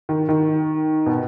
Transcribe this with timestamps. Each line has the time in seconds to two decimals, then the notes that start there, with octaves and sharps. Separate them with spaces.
0.09 D#3
0.29 D#3
1.06 B2